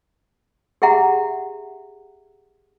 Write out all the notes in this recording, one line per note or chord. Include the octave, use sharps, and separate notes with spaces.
G4 G#4 E5 F#5 A#5